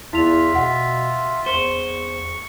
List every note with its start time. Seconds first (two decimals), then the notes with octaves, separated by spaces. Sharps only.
0.13 E2 E4 F4 E5 F7
0.55 B2 F#5
1.46 E2 C5 C#6